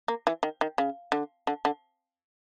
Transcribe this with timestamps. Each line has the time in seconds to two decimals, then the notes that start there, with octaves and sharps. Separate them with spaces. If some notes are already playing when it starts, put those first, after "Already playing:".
0.08 A#3
0.27 E3
0.43 D#3
0.61 D#3
0.78 C#3
1.12 D3
1.47 D3
1.65 D3